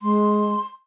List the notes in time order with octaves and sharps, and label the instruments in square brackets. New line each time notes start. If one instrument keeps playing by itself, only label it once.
[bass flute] G#3 [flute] C6